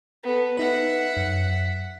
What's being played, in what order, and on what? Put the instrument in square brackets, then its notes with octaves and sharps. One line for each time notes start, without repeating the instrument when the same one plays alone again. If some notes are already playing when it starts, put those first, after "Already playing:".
[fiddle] B3 A4
[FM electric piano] D#4 B4 [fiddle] E5 F#5
[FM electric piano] F#2